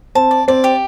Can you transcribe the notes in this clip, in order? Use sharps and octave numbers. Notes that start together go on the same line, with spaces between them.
C4 A5
D5
C4 D5
G4